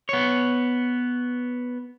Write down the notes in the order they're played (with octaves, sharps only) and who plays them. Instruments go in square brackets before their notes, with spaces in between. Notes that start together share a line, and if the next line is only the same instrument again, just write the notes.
[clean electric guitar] B3 C#5